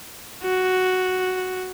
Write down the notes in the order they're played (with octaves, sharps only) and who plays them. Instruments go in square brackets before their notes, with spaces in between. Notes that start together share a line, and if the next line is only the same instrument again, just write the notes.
[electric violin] F#4